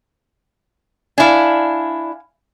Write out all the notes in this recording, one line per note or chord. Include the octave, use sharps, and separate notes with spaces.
D4 E4 F5 G#5